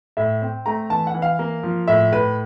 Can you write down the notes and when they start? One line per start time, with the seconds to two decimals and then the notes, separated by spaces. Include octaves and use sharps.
0.17 A2 E5
0.42 C4
0.66 A3 A#5
0.90 E3 A5
1.07 F#5
1.14 E3
1.22 F5
1.39 A#3
1.63 F3
1.88 A2 E5
2.12 A2 B4